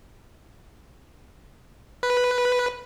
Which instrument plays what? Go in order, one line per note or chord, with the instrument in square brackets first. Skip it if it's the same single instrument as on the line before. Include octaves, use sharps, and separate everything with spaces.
[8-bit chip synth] B4